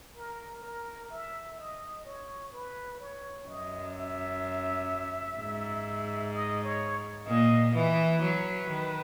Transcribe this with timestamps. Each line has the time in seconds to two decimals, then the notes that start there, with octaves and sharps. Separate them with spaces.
0.16 A#4
0.64 A#4
1.10 E5
1.58 D#5
2.05 C#5
2.53 B4
3.00 C#5
3.48 F#2 D#5
3.95 E5
5.38 G#2
6.33 D#5
6.63 C#5
7.26 A#2 D#5
7.75 E3 B4
8.22 F#3
8.70 D#3